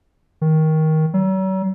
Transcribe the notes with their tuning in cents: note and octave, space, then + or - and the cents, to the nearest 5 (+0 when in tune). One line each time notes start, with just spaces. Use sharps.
D#3 +15
F#3 +45